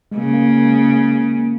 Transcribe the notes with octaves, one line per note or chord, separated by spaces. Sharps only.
G#3
C#3 A#3
A#3
A#3
G#3
A#3
A#3